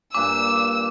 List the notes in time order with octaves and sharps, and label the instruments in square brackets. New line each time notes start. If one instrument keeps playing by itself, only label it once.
[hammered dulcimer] G2 A#2 G#5 [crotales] D6 [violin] E6